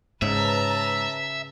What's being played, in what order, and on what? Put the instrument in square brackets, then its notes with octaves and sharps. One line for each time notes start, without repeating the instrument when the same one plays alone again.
[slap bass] G#2 [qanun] C#3 [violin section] B4 A5 A#5 [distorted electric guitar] E5